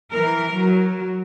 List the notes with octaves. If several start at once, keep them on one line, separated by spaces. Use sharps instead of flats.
E3 A#4
F#3